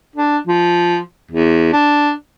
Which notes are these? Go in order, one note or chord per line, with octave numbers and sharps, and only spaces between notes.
D4
F3
E2
D4